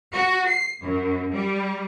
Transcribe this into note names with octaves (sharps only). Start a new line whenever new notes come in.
F#4
C7
F#2
G3